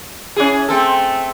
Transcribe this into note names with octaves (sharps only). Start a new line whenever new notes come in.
C#4 E4 G#4
A3 C4 A4